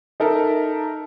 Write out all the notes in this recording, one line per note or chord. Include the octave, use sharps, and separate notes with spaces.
D#4 A4 A#4 E5